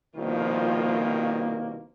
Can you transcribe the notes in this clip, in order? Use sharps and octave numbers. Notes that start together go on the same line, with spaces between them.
C2 B2 D#3 F3 A#3 F4